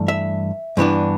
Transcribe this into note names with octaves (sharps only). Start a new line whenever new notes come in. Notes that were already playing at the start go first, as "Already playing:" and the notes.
Already playing: G2 E3 A3
E5
G2 E3 B3 D4